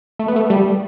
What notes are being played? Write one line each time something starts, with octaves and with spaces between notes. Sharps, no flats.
A3
B3
A3
G3